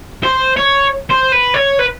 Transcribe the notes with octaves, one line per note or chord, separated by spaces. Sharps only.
C5
C#5
C5
B4
C#5
B4